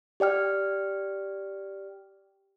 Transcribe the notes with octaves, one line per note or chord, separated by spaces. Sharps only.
G4 D5 G5 F6